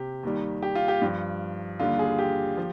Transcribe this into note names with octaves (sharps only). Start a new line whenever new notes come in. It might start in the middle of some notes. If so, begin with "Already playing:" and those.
Already playing: C3 G4
D#2 D#3 G3
G4
F4
G4
G2 F3
D#2 D3 G3 F4
G#4
G4
F3